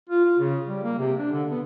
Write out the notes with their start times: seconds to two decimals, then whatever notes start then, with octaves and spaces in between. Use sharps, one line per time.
0.10 F4
0.25 F4
0.39 C#3
0.67 G3
0.83 A#3
0.99 C3
1.18 D4
1.31 D3
1.51 B3